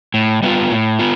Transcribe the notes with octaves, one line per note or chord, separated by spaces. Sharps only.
A2
G3 B3 F4
A2
B3 F4